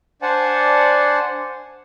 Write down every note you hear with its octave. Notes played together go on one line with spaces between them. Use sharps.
D4 C5 D5 F#5 G#5 A5